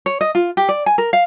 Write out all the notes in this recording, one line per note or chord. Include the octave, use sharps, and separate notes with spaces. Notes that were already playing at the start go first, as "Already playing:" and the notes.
C#5
D#5
F4
G4
D5
G#5
A#4
F5